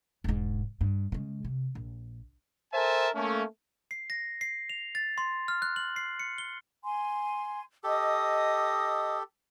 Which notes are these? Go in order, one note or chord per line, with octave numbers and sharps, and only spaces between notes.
E1 G#2
G2
C#3 G#3
C3
A#1
A4 A#4 C5 E5 G#5 A5
A3 A#3 C#4
C7
A#6
C7
F7
A6
C6
F6
F#6
F#7
C7
C#7
G7
G#5 C6
G4 A4 D#5 D#6